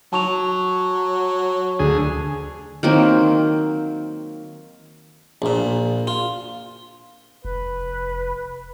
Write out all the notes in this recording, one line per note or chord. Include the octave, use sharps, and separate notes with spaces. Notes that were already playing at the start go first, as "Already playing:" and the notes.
F#3 A5 C#6 F7
D2 G#4
D#3 F#3 A#3 C4
A#1 A#2
F4
F1 B4